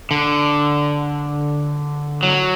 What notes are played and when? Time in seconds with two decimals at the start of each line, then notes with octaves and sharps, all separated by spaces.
0.11 D3
2.23 F#3